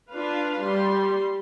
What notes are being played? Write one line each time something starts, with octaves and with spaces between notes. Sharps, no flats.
D4 F4 B4 F5
G3 C6